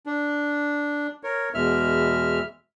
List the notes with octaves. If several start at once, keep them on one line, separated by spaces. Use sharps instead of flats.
D4
A#4 C#5
E2 B2 G#3 E5 F6